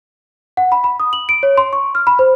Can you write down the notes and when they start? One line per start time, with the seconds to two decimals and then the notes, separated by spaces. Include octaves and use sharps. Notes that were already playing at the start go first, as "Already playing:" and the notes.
0.57 F#5
0.72 B5
0.84 B5
1.00 D#6
1.13 F#7
1.29 D7
1.43 C#5
1.58 C6
1.73 C#6
1.95 F6
2.07 B5
2.19 C5